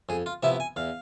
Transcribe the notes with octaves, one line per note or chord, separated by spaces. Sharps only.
F2 G#4
F4
C3 F3 B3 E4 E5
G#5
E2 F5